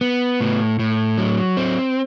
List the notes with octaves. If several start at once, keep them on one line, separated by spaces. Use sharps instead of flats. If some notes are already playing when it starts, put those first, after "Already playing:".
B3
A2
A2
F#3
C4